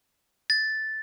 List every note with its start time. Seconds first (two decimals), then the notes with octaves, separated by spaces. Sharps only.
0.50 A6